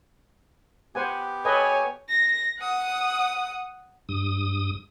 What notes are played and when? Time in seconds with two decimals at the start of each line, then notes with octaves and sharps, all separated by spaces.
0.95 B3 G4 C5 F#5 G#5
1.45 A4 B4 C#5 D#5 G#5
2.09 A#6
2.59 F#5 D#6
4.09 G2 D#6